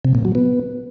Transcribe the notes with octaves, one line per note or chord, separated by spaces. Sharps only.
C3
A#2
F#3
B3